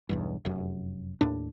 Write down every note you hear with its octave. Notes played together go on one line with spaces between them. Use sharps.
B1 E2 G2
F1 F#2
D#2 A2 D4